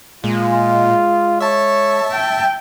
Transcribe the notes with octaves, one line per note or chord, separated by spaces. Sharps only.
A#2 G#3 F4
C#5 E5 A5
G5